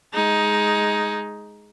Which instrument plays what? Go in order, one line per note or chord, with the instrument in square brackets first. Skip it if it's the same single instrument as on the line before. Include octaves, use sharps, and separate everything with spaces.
[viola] G#3 D#4